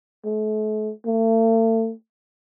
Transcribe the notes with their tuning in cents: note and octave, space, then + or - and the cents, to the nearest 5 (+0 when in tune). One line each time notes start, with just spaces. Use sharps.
A3 -40
A3 +40